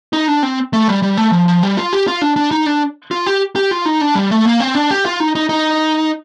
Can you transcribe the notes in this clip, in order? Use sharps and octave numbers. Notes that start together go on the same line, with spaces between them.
D#4
D4
C4
A3
G3
G3
A3
F3
F3
G3
F4
G4
F4
D4
D4
D#4
D4
F4
G4
G4
F4
D#4
D4
G3
A3
A#3
C4
D4
G4
F4
D#4
D#4
D#4